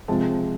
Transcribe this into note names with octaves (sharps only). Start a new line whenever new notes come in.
C3 F3 G#3 A5